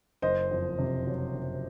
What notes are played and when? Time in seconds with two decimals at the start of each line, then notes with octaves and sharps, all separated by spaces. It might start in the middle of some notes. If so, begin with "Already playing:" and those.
0.22 F#1 C5 D#5
0.51 F2
0.79 C3
1.07 F#3
1.34 F#1